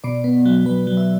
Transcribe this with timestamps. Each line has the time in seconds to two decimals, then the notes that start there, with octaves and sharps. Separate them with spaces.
0.04 B2 D5
0.24 B3
0.45 F#3
0.65 F#3 B4
0.87 F#3
0.97 E5